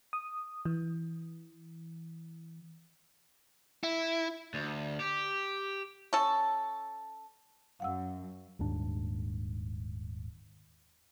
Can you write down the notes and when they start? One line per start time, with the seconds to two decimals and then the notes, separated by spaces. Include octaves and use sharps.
0.13 D#6
0.65 E3
3.84 E4
4.54 D2
5.00 G4
6.13 C#4 A4
7.80 F#2 F5 F#5 E6
8.59 D#1 D#2 G#2 D4